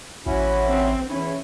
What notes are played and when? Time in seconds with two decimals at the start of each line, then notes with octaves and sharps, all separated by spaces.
0.26 A1 C#4 E4 F#4
0.67 C4
1.10 E2 C#4 E4